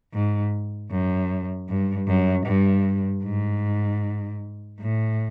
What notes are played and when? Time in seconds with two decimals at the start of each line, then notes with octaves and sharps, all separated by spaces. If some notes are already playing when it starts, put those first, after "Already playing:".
0.13 G#2
0.91 F#2
1.68 G2
2.08 F#2
2.46 G2
3.24 G#2
4.80 A2